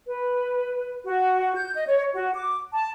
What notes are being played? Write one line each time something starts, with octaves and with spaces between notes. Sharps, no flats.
B4
F#4
G6
D#5
C#5
F#4
D6
A5